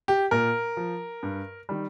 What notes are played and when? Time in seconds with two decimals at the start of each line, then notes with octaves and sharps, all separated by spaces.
0.08 G4
0.31 A#2 A#4
0.77 F3
1.23 G2
1.69 D#3 G3